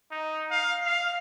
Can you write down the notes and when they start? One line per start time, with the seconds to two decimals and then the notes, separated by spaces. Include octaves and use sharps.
0.11 D#4
0.51 F5
0.86 F5